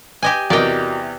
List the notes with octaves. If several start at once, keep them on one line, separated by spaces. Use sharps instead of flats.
G4 D#5 G#5
E2 C3 F#4 A#4 D5 D#5 G5